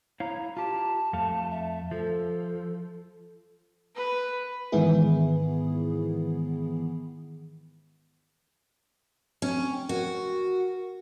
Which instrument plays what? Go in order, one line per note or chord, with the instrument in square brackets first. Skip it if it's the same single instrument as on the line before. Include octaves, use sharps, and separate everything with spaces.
[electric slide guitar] E4 C#5 F5 [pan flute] A#5
[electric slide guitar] F4 G4 [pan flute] A5
[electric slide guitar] F2 A3 F5
[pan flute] E5
[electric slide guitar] F3 [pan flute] A4
[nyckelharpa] B4
[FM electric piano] G#2 D#3 E3 B3 E4 G#4
[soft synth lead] C4 [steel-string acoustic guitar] C#4
[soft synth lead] G5
[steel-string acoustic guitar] F#4 [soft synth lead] A#4